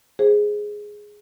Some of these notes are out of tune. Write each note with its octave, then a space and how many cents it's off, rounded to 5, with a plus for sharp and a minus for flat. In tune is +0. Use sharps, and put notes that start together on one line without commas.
G#4 +0 C5 +15